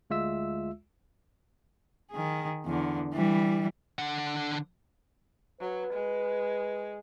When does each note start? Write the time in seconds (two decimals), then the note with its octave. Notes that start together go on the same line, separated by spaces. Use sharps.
0.10 D2 G#3 F4 E5 E6
2.12 D#3 G#4
2.66 E2 D3
3.13 E3 G3
3.99 D3 F#5
5.61 F#3 B4
5.93 G#3